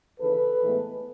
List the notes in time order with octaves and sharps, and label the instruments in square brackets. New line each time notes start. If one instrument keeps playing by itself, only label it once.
[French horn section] D#2 C#3 E3 A4 B4
A2 E3 G#3 B3